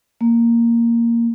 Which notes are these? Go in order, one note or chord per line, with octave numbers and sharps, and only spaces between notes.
A#3